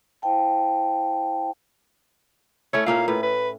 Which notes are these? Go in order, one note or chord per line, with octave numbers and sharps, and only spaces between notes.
E4 C5 F5 G5 A5
A3 C#4 E4 C#5
A#2 A#3 C#4 F5
A2 B4
B4